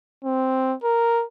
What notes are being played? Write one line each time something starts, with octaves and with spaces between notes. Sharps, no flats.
C4
A#4